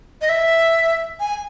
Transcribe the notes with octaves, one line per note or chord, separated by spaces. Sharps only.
D#5
E5
G#5